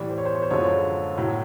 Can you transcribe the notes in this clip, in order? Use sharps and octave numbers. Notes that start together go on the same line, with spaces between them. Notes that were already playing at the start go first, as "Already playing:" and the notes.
Already playing: A2 E3 G3 D5
C5
C#5
C5
C#5
C5
F#2 D3 F3 G#3 C#5
A2 F#3